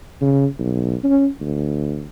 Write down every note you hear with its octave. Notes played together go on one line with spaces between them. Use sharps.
C#3
B1
C#4
D2